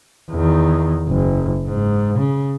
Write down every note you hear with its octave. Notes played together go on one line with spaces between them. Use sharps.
E2 D#3
F#1
G#2
C#3